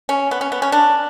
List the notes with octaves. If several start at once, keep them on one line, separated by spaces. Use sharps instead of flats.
C#4
B3
C#4
B3
C#4
D4